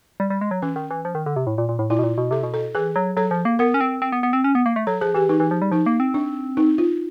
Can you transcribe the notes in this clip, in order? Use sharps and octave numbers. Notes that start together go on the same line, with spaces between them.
G3
G3
G#3
F#3
E3 C#4
D#3
E3
F3
D#3
D3
C3
A2
A#2
A#2
A2
A#2 E4
B2
A#2
B2
C3 A4
B2
A4
E3 G#4
F#3
F#3 A4
F3
A#3
B3 A#4
C#4
C4
C4
B3
B3
C4
C#4
B3
A#3
A3
F#3 A4
F3 G#4
E3 G4
E3 D#4
E3
F3
G3
F3 D#4
A#3
C4
D4
D#4
F4